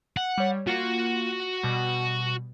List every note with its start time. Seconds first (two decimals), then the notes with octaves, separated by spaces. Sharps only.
0.17 F#5
0.38 G3 C#5
0.67 A#3 F4 F#4
1.63 B2 G3